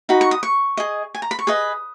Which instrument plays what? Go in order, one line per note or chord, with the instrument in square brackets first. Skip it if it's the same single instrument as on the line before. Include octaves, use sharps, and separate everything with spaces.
[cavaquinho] D#4 F#4 B5
C#6
D#6
C#6
G#4 D#5
G#5
A#5
B5
C#6
G#4 B4 D#5 D#6